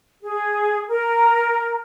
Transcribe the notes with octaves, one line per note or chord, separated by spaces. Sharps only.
G#4
A#4